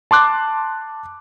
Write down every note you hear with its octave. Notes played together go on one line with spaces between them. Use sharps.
A5 C6 D6 F#6